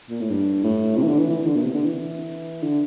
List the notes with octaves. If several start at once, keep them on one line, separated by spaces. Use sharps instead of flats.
A#2
A2
G2
A2
C3
E3
D3
E3
E3
D3
A#2
C3
D3
E3
D3